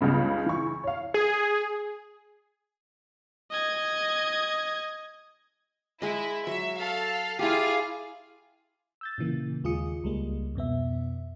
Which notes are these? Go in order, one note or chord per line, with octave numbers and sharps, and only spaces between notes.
C#2 G2 C#3 B3
E3 C#6
C#5 F5
G#4
D#5 G#6
G#3 E4 D#5
F#3 E5
A4 F5
E4 F4 G4 G#4 F5
E6 G6 A6
A#2 C#3 E3 A#3
D#2 G#3 F4 G#4 D#6 C#7
C#2 G3 G#3 A#3
F2 B2 B3 E5